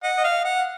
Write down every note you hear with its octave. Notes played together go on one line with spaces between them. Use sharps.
D#5 F#5
D#5
F5
F#5